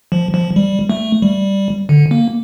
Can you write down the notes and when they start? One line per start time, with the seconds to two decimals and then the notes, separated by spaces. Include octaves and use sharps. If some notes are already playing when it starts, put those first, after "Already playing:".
0.12 F3
0.34 F3
0.56 G3
0.90 A3
1.22 G3
1.89 D3
2.11 A#3